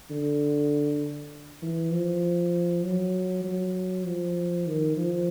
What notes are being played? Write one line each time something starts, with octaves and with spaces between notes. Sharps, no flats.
D3
E3
F3
F#3
F#3
F3
D#3
F3